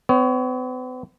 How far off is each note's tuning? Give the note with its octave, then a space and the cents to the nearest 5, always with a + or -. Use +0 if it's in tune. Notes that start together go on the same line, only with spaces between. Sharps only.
B3 +45 C#5 +25